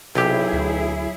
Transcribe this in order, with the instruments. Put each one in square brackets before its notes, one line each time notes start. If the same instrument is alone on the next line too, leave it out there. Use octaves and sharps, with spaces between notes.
[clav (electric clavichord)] B1 G4 [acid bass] C3 [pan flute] F#3 [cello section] E4 G#4
[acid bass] D2